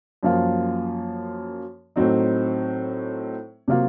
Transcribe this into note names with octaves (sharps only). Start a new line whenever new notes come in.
F#2 F3 A#3 F4
A2 F#3 C4 D#4
C3 F#3 A#3 F4